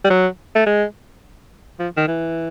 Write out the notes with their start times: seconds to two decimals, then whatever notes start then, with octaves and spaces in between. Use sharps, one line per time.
0.05 G3
0.10 F#3
0.55 A3
0.66 G#3
1.80 F3
1.97 D#3
2.08 E3